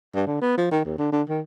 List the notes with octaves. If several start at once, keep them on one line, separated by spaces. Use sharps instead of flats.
G2
D3
B3
F3
D#3
D#2
D3
D3
D#3